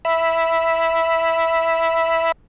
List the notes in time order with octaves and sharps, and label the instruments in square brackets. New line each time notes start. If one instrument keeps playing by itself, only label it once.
[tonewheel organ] E5 B5